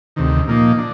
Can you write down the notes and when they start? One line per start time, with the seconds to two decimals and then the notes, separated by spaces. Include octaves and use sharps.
0.16 D2 C3 D#3
0.47 A#2 F3 A#3 D#4
0.78 D4